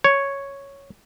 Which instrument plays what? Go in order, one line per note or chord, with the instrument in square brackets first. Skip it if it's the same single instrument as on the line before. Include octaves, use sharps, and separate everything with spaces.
[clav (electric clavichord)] C#5